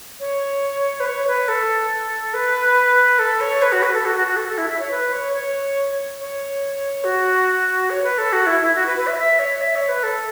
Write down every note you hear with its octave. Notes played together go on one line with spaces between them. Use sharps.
C#5
B4
C#5
B4
A4
B4
A4
C#5
B4
F#4
B4
A4
F#4
F#4
F#4
A4
A4
E4
E5
C#5
B4
C#5
C#5
C#5
F#4
C#5
B4
A4
F#4
E4
E4
F#4
B4
B4
E5
E5
C#5
E5
C#5
B4
A4